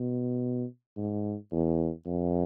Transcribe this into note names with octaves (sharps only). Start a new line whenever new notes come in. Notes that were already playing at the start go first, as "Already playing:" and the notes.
Already playing: B2
G#2
E2
F2